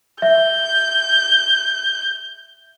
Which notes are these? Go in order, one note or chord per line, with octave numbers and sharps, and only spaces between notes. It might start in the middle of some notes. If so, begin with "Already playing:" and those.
E5 G6